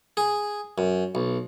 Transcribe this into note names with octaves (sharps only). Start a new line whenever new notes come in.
G#4
F#2
B1